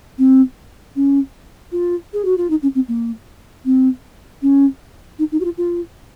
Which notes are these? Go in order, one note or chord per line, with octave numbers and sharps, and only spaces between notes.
C4
C#4
F4
G#4
F#4
F4
D#4
C#4
C4
A#3
C4
C#4
D#4
D#4
F#4
F4
F4